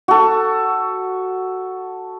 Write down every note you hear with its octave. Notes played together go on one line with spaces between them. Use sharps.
F#4 A4